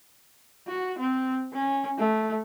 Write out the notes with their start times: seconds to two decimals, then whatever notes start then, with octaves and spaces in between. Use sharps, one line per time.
0.67 F#4
0.98 C4
1.53 C#4
1.98 A3